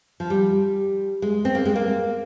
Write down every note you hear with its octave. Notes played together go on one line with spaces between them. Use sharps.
F3
G3
G#3
C4
A#3
G#3
A#3